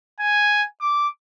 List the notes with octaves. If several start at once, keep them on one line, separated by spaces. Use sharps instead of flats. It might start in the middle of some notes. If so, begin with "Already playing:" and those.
G#5
D6